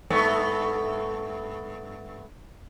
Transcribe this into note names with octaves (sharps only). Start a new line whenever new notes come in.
G2 A3 B3